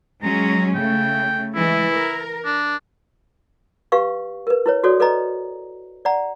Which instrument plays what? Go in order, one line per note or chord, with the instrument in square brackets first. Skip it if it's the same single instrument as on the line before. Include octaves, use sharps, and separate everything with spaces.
[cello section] F#3 G#3 C#4 [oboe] A#5
[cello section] C#3 A3 [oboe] G5
[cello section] E3 G#3 [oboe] E4
[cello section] A#4
[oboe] D4
[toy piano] G4 B4 F5 C#6
A#4 B4
E4 B4 C#5
F#4 A4 C#5 D5 D#6
A4 B4 D5 D#5 A#5
D5 F#5 A#5